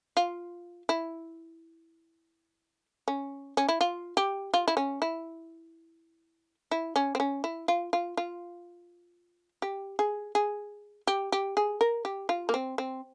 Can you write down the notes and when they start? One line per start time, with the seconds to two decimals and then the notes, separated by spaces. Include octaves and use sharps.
0.17 F4
0.89 E4
3.08 C#4
3.57 C#4
3.68 E4
3.81 F4
4.17 G4
4.54 F4
4.68 E4
4.77 C#4
5.02 E4
6.71 E4
6.96 C#4
7.15 C4
7.20 C#4
7.44 E4
7.68 F4
7.93 F4
8.17 F4
9.62 G4
9.99 G#4
10.35 G#4
11.07 G4
11.32 G4
11.57 G#4
11.81 A#4
12.05 G4
12.29 F4
12.49 A#3
12.54 C4
12.78 C4